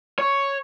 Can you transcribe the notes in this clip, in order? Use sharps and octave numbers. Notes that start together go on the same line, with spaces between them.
C#5